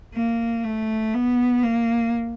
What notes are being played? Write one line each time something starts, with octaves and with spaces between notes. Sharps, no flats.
A#3
A3
B3
A#3